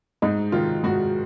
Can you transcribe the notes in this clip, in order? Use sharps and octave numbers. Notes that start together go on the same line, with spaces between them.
G#2 D#4
D#3 F4
G#2 F#4